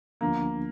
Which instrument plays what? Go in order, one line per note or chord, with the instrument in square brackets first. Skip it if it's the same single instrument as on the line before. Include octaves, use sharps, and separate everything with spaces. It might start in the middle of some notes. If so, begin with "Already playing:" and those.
[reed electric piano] D2 D3 F3 B3 D4 [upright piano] A#3